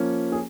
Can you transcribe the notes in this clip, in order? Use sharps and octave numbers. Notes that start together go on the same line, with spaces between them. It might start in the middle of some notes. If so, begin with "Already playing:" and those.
Already playing: F3 A#3 C#4
G#4